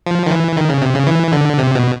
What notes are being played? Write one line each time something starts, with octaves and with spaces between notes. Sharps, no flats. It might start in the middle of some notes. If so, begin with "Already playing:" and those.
F3
D#3
E3
D#3
C#3
C3
C#3
E3
D3
C3
B2